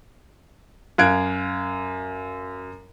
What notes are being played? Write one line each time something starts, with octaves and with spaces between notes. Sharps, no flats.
F#2 F5 F#6 G#6 D7